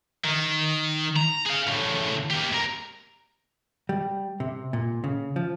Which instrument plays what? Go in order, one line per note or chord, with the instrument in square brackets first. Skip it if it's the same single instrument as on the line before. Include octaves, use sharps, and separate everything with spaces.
[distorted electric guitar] D#3
A#5
G#4 F5
A2 C#3
A#3 G4
C2 A#4
[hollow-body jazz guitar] G3
C3
A#2
C#3
F3